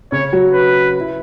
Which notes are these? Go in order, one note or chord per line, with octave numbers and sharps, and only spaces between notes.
C#3 C#4 C#5
F#3 F#4
B4
E4